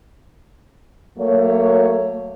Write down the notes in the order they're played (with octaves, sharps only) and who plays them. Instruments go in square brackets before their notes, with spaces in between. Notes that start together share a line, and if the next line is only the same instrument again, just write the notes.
[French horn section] F#3 A3 A#3 C#5